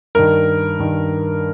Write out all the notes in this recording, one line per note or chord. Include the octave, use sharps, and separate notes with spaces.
G2 D#3 A#4
G2 D#3